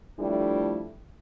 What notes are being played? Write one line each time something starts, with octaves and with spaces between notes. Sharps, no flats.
F3 G3 A3 D4 E4